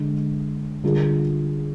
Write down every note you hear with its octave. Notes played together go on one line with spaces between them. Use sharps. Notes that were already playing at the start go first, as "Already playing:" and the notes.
Already playing: D3 G#3 D4
D3 G3 D4 F4 G#4